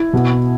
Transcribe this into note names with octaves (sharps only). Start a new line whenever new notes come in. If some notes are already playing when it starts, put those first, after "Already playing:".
Already playing: E4
B2